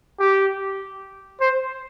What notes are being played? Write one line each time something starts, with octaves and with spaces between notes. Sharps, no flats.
G4
C5